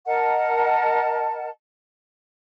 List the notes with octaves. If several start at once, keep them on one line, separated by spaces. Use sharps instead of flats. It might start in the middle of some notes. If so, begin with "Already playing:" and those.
A#4 D#5 F#5 A5